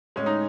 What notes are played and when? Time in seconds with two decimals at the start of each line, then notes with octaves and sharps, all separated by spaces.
0.16 A2 G#3 C#4
0.26 D#4